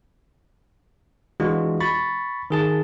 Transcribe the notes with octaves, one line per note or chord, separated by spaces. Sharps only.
E3 G#3 D4 F4 F#4
B5 C#6 A6
D#3 G#4 A5